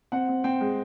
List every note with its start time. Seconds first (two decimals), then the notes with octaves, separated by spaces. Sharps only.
0.12 C4 F#5
0.29 C4
0.44 C4 G5
0.60 G#3